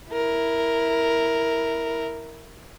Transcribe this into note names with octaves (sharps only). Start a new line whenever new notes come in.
E4 A#4